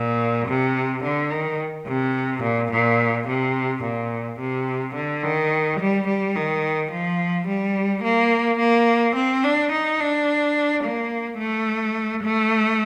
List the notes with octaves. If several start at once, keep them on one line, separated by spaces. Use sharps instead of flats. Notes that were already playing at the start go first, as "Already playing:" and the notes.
Already playing: A#2
C3
D3
D#3
C3
A#2
A#2
C3
A#2
C3
D3
D#3
G3
G3
D#3
F3
G3
A#3
A#3
C4
D4
D#4
D4
A#3
A3
A3